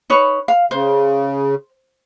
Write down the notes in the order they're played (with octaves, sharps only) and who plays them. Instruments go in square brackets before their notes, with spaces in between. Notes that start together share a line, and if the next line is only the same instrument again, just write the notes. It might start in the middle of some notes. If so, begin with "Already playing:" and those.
[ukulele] D#4 B4 C#5
F5
[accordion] C#3 [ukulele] C5